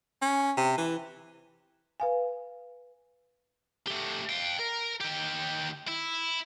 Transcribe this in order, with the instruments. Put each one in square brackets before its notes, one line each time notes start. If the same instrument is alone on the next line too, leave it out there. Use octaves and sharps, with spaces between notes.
[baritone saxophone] C#4
C3
E3
[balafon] B4 F5 G#5
[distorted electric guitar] A3 G4
F5 G5
A#4
D#3 G4
E4